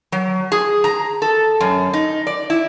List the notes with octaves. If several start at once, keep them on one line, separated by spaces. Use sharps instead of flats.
F#3
G#4
A#5
A4
F#2
D#4
D5
E4